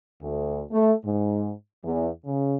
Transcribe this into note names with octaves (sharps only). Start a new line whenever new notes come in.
D2
A3
G#2
E2
C#3